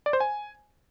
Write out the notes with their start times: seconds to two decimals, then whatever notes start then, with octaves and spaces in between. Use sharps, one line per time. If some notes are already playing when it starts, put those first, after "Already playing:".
0.06 D5
0.13 C5
0.20 G#5